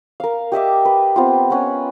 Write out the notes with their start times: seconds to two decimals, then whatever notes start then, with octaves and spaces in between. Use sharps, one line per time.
0.20 A#4 F5
0.52 G4 D#5 E5 D6
0.85 B4
1.16 B3 C4 F4
1.50 B3 C#4 B4